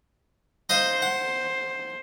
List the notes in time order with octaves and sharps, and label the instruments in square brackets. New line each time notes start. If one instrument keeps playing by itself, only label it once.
[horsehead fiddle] C5 [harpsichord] D#5 F5 D#6
[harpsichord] F#5